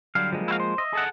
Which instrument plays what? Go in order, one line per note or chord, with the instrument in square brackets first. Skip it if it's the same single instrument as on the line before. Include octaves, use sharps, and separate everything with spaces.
[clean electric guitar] D3 F#3 G3 [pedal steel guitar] F5
[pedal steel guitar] F3 G#3 A#3
[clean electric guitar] E4 F#4 F5
C5
[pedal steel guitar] D#5 E5
[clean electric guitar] G#4 A4 F#5